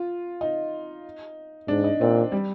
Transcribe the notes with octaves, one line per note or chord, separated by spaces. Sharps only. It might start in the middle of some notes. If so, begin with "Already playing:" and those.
Already playing: F4
D#4
G#2 D4
D#4
A#2 C4
G3